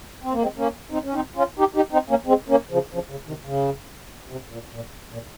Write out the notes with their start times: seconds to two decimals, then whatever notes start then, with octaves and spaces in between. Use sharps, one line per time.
0.24 C4
0.33 A#3
0.42 G#3 C4
0.57 A#3 C#4
0.91 C4 D#4
1.04 C#4
1.14 C4 D#4
1.36 C#4 F4
1.59 D#4 G4
1.76 D#4 G4
1.93 C4 D#4
2.10 A#3 C#4
2.26 G#3 C4
2.49 A#3 C#4
2.71 C#3 F3
2.94 C#3 F3
3.11 C#3
3.28 C3 D#3
3.45 C#3
4.30 C3
4.51 A#2
4.74 A#2
5.13 A#2